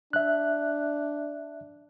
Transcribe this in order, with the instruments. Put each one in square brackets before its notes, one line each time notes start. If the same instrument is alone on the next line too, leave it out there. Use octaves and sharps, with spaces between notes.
[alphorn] D4 [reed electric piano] E5 F#6